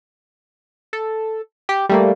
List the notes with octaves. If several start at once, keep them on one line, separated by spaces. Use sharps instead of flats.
A4
G4
G3 A3 A#3